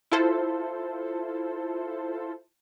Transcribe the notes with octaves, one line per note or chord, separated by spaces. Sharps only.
E4 F4 A4 C5